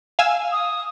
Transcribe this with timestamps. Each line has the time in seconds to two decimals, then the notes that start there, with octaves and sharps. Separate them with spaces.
0.19 F5 G#5 E6
0.52 D#6